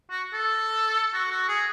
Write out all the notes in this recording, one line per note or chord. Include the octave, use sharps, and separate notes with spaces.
F#4
A4
F#4
F#4
G#4